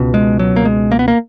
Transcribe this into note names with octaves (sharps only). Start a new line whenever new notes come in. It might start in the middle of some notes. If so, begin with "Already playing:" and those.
Already playing: C#2 B2
G#3
F#3
A#3
G#3
A#3
B3
A#3